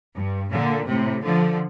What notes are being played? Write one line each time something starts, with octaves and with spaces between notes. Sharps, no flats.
G2
A#2 D3
A2 C3
D3 F3